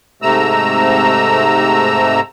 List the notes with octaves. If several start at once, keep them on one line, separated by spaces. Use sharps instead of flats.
G#2 C3 A3 A#5 E6